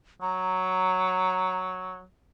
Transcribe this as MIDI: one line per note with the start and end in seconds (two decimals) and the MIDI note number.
0.22 2.04 54
0.22 1.61 82